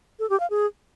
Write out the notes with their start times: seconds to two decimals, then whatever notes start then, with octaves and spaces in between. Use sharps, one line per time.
0.19 A4
0.30 G4
0.40 F5
0.50 G#4